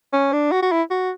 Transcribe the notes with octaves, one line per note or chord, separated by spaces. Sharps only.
C#4
D4
F#4
F#4
E4
F#4